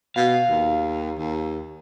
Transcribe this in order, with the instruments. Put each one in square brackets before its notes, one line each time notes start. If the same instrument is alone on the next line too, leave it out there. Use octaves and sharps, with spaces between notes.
[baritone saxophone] B2 [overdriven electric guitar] F5
[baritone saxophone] D#2
D#2